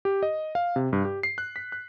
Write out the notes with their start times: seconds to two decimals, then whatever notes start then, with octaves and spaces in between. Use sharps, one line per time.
0.05 G4
0.23 D#5
0.55 F5
0.76 C3
0.93 G2
1.05 G4
1.23 C7
1.38 F#6
1.56 B6
1.72 F#6